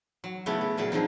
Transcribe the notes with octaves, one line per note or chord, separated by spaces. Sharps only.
F#3
C#3 A3 B3 E4
C#3
A#2 C#3 F#3 G#4
D3 F3 C4 D#4